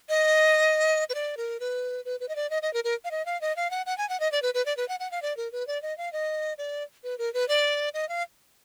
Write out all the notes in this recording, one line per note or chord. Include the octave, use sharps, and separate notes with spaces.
D#5
B4
D5
A#4
B4
B4
B4
D#5
D5
D#5
D#5
A#4
A#4
F5
D#5
F5
D#5
F5
F#5
F#5
G#5
F#5
D#5
D5
B4
B4
D5
B4
F#5
F#5
F5
D5
A#4
B4
D5
D#5
F5
D#5
D5
B4
A#4
B4
D5
D#5
F5